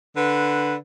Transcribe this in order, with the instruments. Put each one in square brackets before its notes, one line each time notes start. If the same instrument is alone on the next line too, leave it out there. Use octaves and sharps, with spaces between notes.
[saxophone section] D3 B4